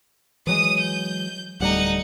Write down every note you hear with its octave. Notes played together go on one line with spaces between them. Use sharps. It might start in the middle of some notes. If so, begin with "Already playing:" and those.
E3 F#3 G#3 D#6 D#7
G6
D1 G3 A3 D#4 F#5